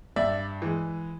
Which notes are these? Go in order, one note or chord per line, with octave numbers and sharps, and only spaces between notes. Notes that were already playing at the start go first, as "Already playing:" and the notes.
G2 D5 E5
E3 G#3